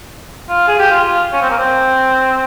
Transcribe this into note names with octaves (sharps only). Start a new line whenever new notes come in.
F4
G#4
G4
F4
C#4
C4
A#3
C4